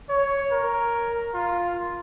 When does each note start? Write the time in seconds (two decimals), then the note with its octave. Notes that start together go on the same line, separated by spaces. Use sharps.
0.09 C#5
0.52 A#4
1.34 F4